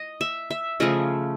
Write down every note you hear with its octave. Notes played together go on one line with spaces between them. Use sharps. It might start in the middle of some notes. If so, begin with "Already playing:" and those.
Already playing: D#5
E5
E5
C#3 F3 A3 C#4 D#5